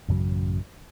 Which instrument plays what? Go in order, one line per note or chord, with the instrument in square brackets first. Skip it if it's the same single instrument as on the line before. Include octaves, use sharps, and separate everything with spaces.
[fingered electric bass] A1 F#2 C#3 F#3